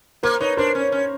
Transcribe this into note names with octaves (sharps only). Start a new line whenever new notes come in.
A#3 A#4 C5
D#4 B4 C#5
D4 A#4 C5
C#4
C#4